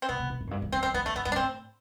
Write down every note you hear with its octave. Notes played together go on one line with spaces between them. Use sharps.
C4
B2 B3
B2
B2
A2
F#2
G2
F#2
F#2 C4
F#2 C4
E2 B3
E2 A3
F#2 B3
G2 B3
D4
A2 C4